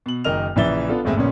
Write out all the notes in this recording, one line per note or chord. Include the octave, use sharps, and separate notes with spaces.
B2 F#7
F#1 D#3 A#4 D#5 F6 F7
A#1 C#3 E3 E5 A6 G7
B3 D4 F4 A4
G1 D#2 A2 G#3 C4 E5
A#1 A#2 C#3 B3 C#4